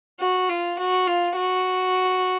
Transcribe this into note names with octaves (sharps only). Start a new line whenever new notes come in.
F#4
F4
F#4
F4
F#4